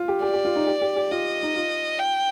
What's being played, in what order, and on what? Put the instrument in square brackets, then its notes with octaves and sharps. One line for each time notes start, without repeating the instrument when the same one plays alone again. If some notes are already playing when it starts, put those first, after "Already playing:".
Already playing: [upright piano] F4
G4
[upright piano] G4 [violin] D5
[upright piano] G4
F4
D#4
G4
G4
G4
[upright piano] F4 [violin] D#5
[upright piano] D#4
F4
[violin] G5